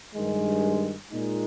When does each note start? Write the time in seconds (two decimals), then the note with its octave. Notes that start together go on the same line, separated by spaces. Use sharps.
0.14 G2 D#3 G#3
1.11 A#2 G#3 D#4